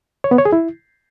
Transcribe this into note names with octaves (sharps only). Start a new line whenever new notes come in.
C#5
B3
C#5
G#4
E4